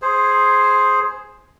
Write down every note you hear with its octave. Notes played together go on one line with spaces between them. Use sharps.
G#4 C5